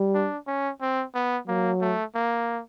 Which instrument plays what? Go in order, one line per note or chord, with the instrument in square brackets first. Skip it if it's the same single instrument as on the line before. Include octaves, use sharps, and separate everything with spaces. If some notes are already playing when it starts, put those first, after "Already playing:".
Already playing: [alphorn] G3
[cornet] D4
C#4
C4
B3
[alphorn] F#3 [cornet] A#3
[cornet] A3
A#3